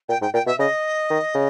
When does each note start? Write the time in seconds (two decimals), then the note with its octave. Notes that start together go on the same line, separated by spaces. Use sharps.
0.09 A#2 G5
0.21 G#2 G5
0.34 A#2 G5
0.46 B2 E5
0.59 C#3 D#5
1.10 D#3
1.35 C#3